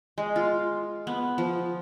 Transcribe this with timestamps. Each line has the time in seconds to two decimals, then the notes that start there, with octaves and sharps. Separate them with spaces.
0.18 G#3
0.36 F4
1.07 B3
1.38 F3